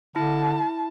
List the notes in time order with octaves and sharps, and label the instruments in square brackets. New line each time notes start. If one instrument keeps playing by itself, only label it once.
[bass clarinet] D3 [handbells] E4 [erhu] A5